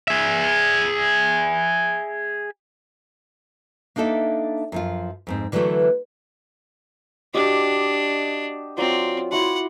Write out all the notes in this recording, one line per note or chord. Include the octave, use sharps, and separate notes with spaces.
G#4 E5
A#3 D4 D#4 A4 E5
F#2 F3 F4
F2 G#2 C4
D3 E3 F#3 G#3 A3
D4 F#4 G4 D#5
F#3 C4 F4 D5
E4 F#4 F#5 C6